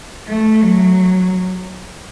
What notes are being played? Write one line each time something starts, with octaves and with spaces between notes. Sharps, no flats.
A3
F#3